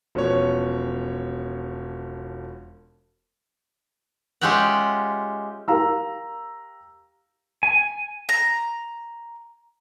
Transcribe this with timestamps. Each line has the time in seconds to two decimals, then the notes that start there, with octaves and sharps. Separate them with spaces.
0.15 E1 F3 B3 C#4 C#5
4.41 G#3 C#4 F4 G4 E5 F#5
5.68 G4 A#4 F5 A#5 E6
7.63 G#5
8.29 A#5